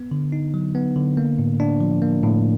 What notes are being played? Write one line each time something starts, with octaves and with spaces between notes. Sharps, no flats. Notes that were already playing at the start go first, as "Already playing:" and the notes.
Already playing: B3
D3
D#4
F#3
B3
D3
A#3
A2
D4
F3
A#3
A2